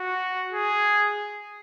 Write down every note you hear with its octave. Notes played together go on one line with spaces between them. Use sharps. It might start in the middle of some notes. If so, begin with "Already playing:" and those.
Already playing: F#4
G#4